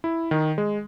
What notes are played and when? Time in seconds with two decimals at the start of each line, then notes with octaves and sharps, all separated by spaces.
0.04 E4
0.31 D#3
0.58 G#3